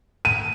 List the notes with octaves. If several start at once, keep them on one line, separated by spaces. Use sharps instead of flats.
D#7